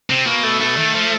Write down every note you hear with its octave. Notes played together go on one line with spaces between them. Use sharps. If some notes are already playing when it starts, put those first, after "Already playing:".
C3 C4
B2 A#3
A3
A3
D#3
F3